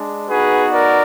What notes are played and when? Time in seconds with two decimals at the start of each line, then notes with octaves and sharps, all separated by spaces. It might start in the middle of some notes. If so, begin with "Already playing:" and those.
Already playing: G#3 D4
0.28 B3 D#4 F#4 G#4 B4
0.72 A#4 D5